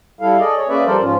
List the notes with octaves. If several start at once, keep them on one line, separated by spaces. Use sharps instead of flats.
G3 E4 A4 F5
G#4 A4 D5 D#5
G#4 C#5
A#3 C#4 G#4 B4 D5 E5
F3 G3 A4 A#4 C5 D5
G#2 F3 C#4 F4